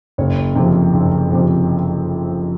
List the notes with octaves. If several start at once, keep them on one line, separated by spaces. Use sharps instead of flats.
F#1 C#5
F2 C3
F#1
F2 C3